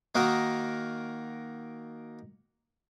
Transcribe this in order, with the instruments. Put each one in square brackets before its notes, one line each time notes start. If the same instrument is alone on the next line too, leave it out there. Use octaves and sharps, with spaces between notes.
[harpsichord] D#3 A#3 D#4 F#4 A#4